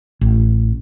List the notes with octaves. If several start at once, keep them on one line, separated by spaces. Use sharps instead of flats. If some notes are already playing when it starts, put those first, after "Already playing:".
A1